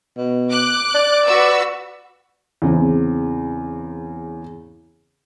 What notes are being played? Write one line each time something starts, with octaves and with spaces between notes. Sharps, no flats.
B2
D6 F#6
D5
F#4 B4 E6
E2 C#3 C4